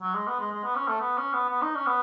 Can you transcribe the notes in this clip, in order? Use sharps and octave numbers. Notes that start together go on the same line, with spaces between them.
F#3
G#3
B3
G#3
G#3
B3
C#4
A3
B3
C#4
B3
B3
D#4
C#4
B3